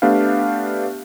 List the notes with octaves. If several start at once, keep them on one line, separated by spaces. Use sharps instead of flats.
A3 B3 D4 G4 B4 F5